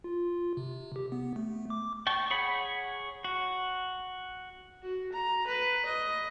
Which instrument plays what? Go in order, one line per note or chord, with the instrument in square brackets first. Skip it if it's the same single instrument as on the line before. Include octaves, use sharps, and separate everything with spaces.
[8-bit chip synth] F4
C3
G4
B3
A3
D6
[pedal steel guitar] G5 A5 C#6
G#4 C#5 F#5 B5
F#4
[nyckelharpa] F#4
A#5
B4
D#5